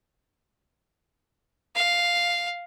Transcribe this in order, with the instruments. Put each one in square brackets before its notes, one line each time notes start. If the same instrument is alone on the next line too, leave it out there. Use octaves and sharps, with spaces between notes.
[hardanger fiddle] F5